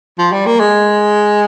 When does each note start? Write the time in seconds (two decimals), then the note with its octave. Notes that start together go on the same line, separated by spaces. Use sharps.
0.18 F3
0.32 G3
0.46 A#3
0.60 G#3